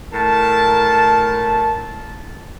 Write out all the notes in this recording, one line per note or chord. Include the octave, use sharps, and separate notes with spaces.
A2 A#4 A5